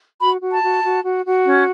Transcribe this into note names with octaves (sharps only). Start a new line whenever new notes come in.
F#4 B5
F#4
A5
F#4
F#4
F#4
F#4
C#4